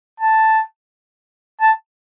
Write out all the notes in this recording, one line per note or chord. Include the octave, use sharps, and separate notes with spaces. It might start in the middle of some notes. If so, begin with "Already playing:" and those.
A5
A5